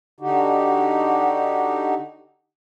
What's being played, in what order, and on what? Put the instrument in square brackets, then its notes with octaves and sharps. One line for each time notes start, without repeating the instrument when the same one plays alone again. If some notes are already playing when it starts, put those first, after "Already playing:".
[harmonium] D3 D#4 F#4 G4